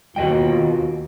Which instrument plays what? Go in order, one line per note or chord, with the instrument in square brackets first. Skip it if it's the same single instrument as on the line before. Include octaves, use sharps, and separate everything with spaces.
[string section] D#2 [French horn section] B2 F4 [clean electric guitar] F#4 D#5 G5